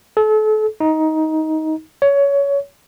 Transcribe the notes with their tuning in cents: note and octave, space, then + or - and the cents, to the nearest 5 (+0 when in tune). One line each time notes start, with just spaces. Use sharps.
A4 -35
D#4 +15
C#5 +20